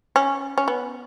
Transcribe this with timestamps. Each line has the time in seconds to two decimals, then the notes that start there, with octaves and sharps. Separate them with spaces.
0.16 C#4
0.58 C#4
0.68 B3